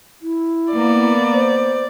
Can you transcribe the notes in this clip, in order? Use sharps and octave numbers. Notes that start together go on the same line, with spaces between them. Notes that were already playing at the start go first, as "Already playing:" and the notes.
E4
A#3 B3 D5
C5